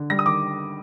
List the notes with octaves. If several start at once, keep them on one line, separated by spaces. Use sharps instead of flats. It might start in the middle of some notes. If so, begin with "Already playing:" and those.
Already playing: D3
G3 A#6
D#6
D#3 D6